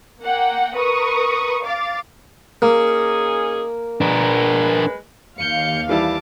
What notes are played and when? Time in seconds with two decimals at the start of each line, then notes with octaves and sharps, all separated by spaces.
0.22 A#3 F#5 G5
0.76 A#4 B4 C#6 D#6
1.64 F5 D6 A6
2.62 A#3 C#4 D#4 G#4
4.01 G#3 D4 A#4 B4
5.39 D#2 F5 G6 C#7
5.89 E3 G3 E4 A5 D6